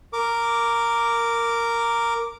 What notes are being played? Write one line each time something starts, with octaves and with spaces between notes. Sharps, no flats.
A#4 D6